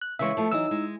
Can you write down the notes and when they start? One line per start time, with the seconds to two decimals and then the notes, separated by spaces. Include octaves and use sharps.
0.01 F#6
0.19 C#3 E3 G#3 E5 C#6
0.37 F3 A3
0.52 E3 F#3 D#4 E6
0.71 G#3